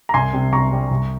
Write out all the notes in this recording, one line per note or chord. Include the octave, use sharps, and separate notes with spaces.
A#5
C2 G#5 C6
C3 G3
C2 A#5 C#6
C3 G3
C2